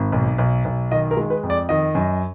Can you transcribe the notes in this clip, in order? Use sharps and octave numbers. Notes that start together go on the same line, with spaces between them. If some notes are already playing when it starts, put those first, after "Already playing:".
Already playing: G#1
B1
B1
B1
D#3 D#5
A#4
G#3
B4
F2
D5
D#3 D#5
F#2